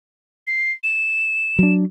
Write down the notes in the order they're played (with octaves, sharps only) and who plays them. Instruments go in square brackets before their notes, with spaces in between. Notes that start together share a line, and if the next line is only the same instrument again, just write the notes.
[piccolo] C7
E7
[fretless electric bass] F#3 D4